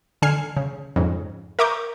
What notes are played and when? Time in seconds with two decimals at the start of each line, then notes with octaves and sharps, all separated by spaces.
0.22 D3 G#5 F6 C7
0.57 C#3
0.96 F2 G#2 C#3
1.59 A#4 E5 A#5 C#6 D6 G6